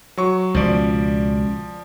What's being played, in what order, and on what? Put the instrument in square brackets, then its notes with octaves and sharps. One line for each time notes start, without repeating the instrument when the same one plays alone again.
[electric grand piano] F#3 C#6
[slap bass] C#2 B2 [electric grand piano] F3 D5